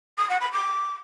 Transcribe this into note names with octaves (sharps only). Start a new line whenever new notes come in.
D#6
F#5
B5
D6